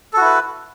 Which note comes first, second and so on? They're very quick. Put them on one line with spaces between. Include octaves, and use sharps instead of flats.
A4 F#4 E4 B4